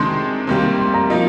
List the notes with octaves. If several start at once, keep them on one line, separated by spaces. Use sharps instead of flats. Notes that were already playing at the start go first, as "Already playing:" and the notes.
Already playing: C3 D#3 G#3 D4 C6
C3 D#3 G3 A#3
C6
A#5
F3 A#3 D#4